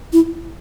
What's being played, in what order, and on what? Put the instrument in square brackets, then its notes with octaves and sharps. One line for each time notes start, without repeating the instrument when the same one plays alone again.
[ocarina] E4